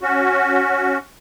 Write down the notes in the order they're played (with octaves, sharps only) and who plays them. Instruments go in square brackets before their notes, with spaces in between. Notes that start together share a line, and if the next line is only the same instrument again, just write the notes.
[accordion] C#4 F#4